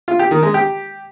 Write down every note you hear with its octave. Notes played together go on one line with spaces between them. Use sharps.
F4
G4
D#3
G#3
G4